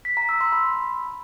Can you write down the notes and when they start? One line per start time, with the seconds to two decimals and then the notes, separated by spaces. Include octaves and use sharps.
0.05 B6
0.17 A#5
0.29 E6
0.41 C6
0.52 B5